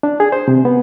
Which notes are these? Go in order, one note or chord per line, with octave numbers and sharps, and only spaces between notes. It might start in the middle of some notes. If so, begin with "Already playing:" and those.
D4
G#4
C5
C3
B3